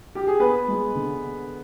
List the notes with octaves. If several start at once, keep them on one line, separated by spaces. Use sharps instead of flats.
G4
G#4
B3 B4
G#3
D3